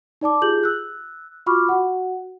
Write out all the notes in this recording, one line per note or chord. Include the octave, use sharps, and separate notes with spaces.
D#4 D5 A5 D6
F4 G4 G#4 G6 F#7
E6 F#6
F4 F#4 B5 C#6 D6 F6
F#4 F#5